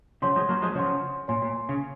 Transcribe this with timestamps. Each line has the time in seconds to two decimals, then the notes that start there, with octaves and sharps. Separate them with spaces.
0.22 C#3 F3 C#5 F#5 C6
0.36 F3 G#3
0.49 F#3 A#3
0.62 F3 G#3
0.75 C#3 F3 C#5 F#5 C6
1.28 A#2 C#5 G#5 C6
1.42 A#2
1.69 C#3